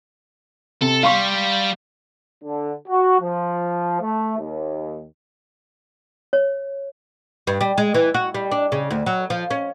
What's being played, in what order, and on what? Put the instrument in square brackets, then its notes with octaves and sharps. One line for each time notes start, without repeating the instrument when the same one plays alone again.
[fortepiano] C3 [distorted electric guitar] A4
[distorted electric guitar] G3 [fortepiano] F5 C6 C#6
[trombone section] D3
F#4
F3
A3
D#2
[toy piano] C#5
[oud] G2
G3
G#3
E3
F#4
G3
D4
C#3
D2
F#3
F3
C#4